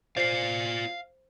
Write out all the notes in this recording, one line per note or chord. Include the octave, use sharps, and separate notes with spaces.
F4 C5 D5 F5 C7